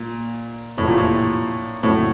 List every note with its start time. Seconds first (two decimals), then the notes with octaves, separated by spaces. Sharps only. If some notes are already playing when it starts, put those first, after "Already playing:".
Already playing: A#2
0.77 F1 E2 A2 C3 F3
0.88 A#2
0.98 A2
1.83 F2 A2 C#3 F#3 A3 C4